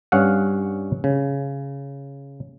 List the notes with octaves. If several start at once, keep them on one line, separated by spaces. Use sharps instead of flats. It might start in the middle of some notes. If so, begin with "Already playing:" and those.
G2 C#4 F5 F#5
C#3